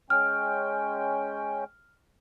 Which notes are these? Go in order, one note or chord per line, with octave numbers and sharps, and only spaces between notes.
G#3 C#4 G5 F6